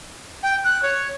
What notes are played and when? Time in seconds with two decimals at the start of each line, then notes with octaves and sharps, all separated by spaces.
0.43 G5
0.64 F#6
0.82 C#5